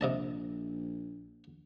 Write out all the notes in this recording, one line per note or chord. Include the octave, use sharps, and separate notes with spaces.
A#1 C3 D#5 A5